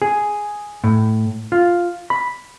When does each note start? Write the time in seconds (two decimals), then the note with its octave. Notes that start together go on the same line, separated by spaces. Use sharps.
0.02 G#4
0.84 A2
1.52 F4
2.10 B5